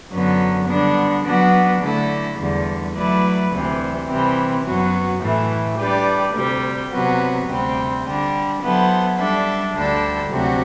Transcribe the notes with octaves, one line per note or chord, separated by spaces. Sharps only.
F#2 D3 F#3 B3
D3 G3 B3 D4
F#3 B3 D4 F#4 B4
D3 A3 E4 A4
E2 D3 G3
F#3 A3 E4 B4 D5
D2 C3 E3
C3 E3 G3 C4
F#2 F#3 B3 F#4
A2 E3 A3
G3 D4 G4 B4 D5
D2 C3 G3
C3 F#3 B3 F#4
D2 C3 G3 C4
D3 G3 D4
F#3 B3 E4 A4 C5
G3 D4 A4 E5
D2 D3 G3 D4 A4
D2 C3 F#3 C4 F#4